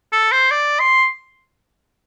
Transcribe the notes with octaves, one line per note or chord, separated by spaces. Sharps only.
A4
C5
D5
C6